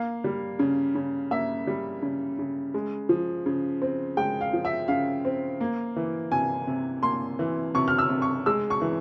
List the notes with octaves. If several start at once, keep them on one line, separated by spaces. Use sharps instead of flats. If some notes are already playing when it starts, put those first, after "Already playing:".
Already playing: A#3 F5
G3
C#3
C#3
A#3 E5
G3
C#3
C#3
G#3
F3
C#3
C4
G#3 G5
F5
F3
E5
C#3 F5
C4
A#3
E3
C3 G#5
C3
A#3 C6
E3
C3 C#6
F6
E6
C3
C#6
G#3 E6
C#6
E3